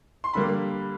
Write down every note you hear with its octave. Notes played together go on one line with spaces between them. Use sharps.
C6
D3 G3 A#3 B5